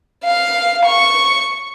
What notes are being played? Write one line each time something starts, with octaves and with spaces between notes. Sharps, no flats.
F5
C#6